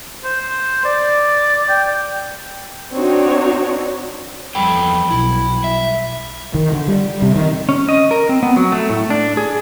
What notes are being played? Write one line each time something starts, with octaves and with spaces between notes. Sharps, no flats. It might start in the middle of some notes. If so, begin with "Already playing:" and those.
C5
D5
G5
C4 D4 D#4 F#4 C#5
E2 F3 G3 A4 G5 B5
B1 B2 E4
E5
D#3
D3
G3
C3
D#3
C#4
D#5
A#4
C4
B3
F#3
A3
A2
D4
G#4